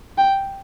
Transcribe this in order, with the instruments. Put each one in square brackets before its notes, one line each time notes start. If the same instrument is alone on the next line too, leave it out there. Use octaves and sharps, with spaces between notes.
[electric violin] G5